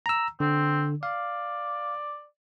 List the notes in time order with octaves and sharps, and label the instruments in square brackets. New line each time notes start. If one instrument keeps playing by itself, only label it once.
[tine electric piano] A#5 E6
[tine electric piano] D3 [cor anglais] C4
[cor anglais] D5 [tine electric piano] F5